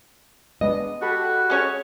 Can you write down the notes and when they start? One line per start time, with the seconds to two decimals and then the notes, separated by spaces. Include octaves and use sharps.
0.61 G#3 B3 D4 D#5
1.02 F#4 G4 A4 B5
1.50 G#3 C#4 C#5